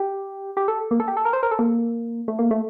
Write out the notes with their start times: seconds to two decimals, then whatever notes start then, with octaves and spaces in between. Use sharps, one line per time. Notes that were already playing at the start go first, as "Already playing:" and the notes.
Already playing: G4
0.57 G4
0.68 A4
0.91 A#3
1.00 A4
1.08 G4
1.17 A4
1.25 A#4
1.33 C5
1.43 A#4
1.51 A4
1.59 A#3
2.28 A3
2.39 A#3
2.51 A3